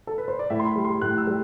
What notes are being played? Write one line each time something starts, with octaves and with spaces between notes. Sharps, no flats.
A4
B4
C5
D5
A2 E5
C6
B5
G3
C6
A2 F#6
E6
G3